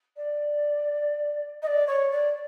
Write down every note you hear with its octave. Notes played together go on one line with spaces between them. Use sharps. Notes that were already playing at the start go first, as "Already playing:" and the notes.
D5
D#5
D5
C#5
D5